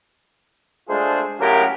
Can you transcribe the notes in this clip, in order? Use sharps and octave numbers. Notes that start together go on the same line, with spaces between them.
G#3 A3 D4 F4 G#4 C5
A2 C#3 F#3 G4 A#4